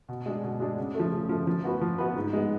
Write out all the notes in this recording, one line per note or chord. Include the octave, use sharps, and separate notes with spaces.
B2
G#3 D4 G#4
B2
G#3 D4 G#4
C#3
F3 A3
C#3
F3 A3
F3
B3 F#4 B4
F3
B3 F#4 B4
G#2
G#3 B3